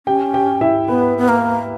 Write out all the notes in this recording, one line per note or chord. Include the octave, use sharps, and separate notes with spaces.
C#4 G4 G5
G4 G5
E4 E5
B3 B4
B3
A#3